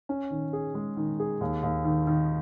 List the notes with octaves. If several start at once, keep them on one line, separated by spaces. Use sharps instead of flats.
C#4
D#3
G#4
G#3
D#3
G#4
D#2
D#2
D#3
D#3